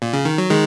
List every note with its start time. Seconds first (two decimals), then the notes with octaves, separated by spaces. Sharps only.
0.02 A#2
0.13 C#3
0.25 D#3
0.38 F#3
0.50 D#3 G#3